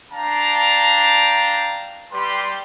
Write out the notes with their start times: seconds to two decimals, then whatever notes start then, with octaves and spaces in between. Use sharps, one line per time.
0.12 D4 F5 G5 A5 A#5
2.12 G3 G4 B4 C6